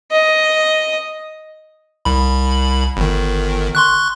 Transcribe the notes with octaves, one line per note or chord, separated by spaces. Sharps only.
D#5
C2 B5
G1 D#3
C6 C#6 F#6